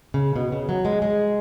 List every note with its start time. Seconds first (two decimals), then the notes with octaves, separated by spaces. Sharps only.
0.14 C#3
0.36 B2
0.52 C#3
0.69 F#3
0.85 G#3
1.02 G#3